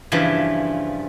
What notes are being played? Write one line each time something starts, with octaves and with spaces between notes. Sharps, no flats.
G2 C#3 E3 F3